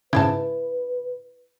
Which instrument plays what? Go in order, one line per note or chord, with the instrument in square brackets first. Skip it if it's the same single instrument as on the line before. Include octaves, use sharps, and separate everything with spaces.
[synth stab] G#2 C#3 [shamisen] E4 G5 A5 [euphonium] B4